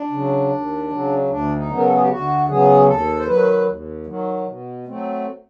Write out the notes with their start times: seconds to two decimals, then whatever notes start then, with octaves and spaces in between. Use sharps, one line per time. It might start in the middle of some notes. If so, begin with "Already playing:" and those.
Already playing: D4
0.10 C#3 F#3
0.50 D#2
0.90 C#3 F#3
1.29 D2 D4
1.56 D#4
1.69 C#3 F#3 B3
1.77 A#4
1.85 A4
1.94 G#4
2.01 G4
2.09 D2 F#4
2.48 C#3 F#3 B3 G#4
2.88 D#2 A4
3.19 C5
3.27 D#3 F#3 B4
3.67 D#2
4.06 D#3 F#3
4.46 B2
4.86 F#3 A3 C4